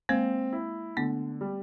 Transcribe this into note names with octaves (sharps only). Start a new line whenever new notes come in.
G#3 A#3 C4
E4
D3 A3 B3
G3